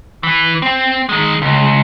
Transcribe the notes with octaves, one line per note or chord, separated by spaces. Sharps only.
E3
C4
D#3 G#3
C#2